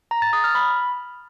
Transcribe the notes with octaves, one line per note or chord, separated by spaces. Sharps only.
A#5
A6
D#6
F6
B5